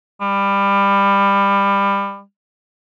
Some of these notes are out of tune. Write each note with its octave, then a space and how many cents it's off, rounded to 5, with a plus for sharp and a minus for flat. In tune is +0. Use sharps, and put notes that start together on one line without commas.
G3 +25